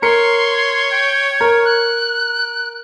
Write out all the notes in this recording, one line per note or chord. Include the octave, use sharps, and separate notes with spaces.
A#4 C#5 C6 C#7
G5
A#4
F#6